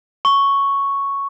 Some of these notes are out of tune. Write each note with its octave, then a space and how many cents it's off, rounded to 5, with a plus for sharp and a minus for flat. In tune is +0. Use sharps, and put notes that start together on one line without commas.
C#6 +0